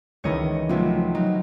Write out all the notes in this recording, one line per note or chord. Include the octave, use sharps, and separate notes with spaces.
C#2 D#3 E3 C#5 D#5 C#7
A2 C3 F3 F#3
F#3 D#4